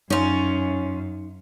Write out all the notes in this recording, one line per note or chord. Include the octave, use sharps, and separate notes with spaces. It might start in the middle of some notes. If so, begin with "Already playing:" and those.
F#2 C#4 D#4 F4